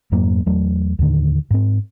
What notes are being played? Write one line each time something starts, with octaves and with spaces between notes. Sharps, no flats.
F2 G#2 F#3 A#3
E2 F#3 A3
D#2 A2 D3 D#3
G#2 C4